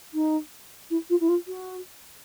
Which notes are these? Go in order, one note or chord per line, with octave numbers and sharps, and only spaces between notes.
D#4
E4
F4
E4
F4
F#4